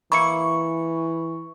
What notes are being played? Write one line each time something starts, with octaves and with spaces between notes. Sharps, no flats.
E3 A#3 E4 B5 C#6 C#7